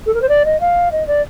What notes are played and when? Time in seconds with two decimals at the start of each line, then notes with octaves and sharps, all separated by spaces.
0.06 A4
0.14 A#4
0.21 C5
0.28 D5
0.45 D#5
0.60 F5
0.92 D#5
1.07 D5